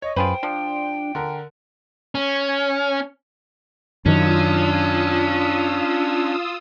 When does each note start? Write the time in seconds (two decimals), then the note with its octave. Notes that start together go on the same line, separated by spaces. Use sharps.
0.02 C#5 D#5
0.16 F#2 F4 G#4 B4 C5 G5
0.43 F3 D4
1.15 D3 A#4
2.15 C#4
4.06 F#2 D#3 C#4 D4 F4 D#6 E6